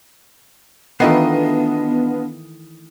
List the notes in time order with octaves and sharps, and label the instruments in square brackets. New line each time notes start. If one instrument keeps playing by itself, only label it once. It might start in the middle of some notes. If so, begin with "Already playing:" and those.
[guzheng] D#3 E3 A3 [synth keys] B3 [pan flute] D4 [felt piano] F4 D#5 C7